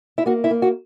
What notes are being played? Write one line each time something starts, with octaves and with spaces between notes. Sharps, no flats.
E4
A#3 F#4
E4
A#3
F#4